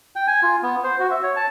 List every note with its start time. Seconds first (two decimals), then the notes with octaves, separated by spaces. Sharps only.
0.16 G5
0.27 G#5
0.43 F4
0.63 B3
0.84 C5
0.99 F#4
1.11 E5
1.23 C#5
1.36 A5